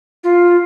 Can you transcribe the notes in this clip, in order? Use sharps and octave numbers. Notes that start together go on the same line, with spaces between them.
F4